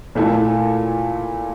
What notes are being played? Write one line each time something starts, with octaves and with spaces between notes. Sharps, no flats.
A#2 A3 E4 A4